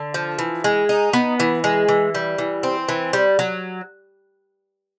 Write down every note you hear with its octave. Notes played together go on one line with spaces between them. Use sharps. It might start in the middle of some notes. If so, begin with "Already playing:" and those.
Already playing: D3
F3
E3
G#3
D#4
B3
E3
G#3
E3
G3
E3
C4
E3
G3
F#3